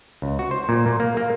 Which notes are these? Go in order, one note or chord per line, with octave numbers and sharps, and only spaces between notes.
C#2
F#4
C5
A#2
A#2
A#3
A#3